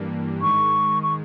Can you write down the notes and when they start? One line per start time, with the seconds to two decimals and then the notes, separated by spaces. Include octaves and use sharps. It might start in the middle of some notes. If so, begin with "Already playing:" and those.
Already playing: G2 E3 G3 A#3 D4
0.42 G#2 D#3 G#3 C#6
1.03 C#6